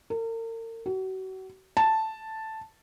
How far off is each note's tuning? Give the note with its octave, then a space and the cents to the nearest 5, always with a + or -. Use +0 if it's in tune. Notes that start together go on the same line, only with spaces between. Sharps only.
A#4 -40
F#4 +35
A5 +0